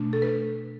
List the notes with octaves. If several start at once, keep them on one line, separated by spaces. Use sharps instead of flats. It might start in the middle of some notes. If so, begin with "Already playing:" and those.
Already playing: B2 A3 D4
A4
B4